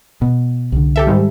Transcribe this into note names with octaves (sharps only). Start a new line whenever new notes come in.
B2
C2 D3
G4 A4 E5
G#2 D#3 G3